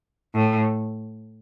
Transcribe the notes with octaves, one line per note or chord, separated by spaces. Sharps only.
A2